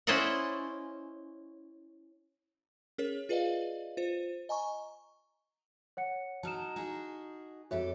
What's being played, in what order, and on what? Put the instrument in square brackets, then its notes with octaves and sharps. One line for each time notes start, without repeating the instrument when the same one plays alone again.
[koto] C#4 E4 C5 D5 D#5 F#5
[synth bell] C#4 G#4 A#4 C#5
F4 G#4 B4 D5 D#5 F5
F4 C5
D#5 G#5 A#5 C#6
[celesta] C#5 F#5 C#7
[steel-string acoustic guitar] F#3 D#4 [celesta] A5 F6 E7
[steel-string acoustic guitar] D#4 F#4 G#4
[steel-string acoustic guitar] F2 G4 A4 [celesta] F#4 C#5 E5